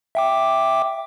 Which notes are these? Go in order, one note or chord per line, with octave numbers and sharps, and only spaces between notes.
E5 G5 D6